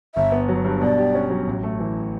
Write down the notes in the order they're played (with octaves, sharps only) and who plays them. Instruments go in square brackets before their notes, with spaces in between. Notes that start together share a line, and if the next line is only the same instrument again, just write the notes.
[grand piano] G1 [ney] E5
[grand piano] B3
F#3
G2
[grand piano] B2 [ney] D5
[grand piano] G4
C#4
F#3
A1
A3
E3